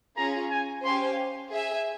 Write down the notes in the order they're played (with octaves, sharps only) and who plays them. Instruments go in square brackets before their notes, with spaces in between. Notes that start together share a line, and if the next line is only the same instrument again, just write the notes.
[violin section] C#4 F4 G#4 [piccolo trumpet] A#5
[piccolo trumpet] G#5
[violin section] C#4 G4 C5 F5 G#5 [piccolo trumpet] C6
[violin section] G#4 E5 G#5